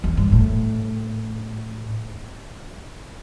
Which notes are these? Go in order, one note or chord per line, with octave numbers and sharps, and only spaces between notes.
E2
G2
A2